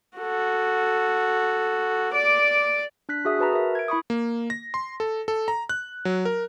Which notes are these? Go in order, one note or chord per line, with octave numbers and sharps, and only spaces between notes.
F#4 A4
D5 D6
D4 F#6 B6
F#4 G#4 E5 D#6
F#4 B4 A5 A#5
A#4 E5
G#6 D7
E4 B5 C#6 D#6
A#3
A#6
C6
A4
A4
A#5
F#6
F#3
A#4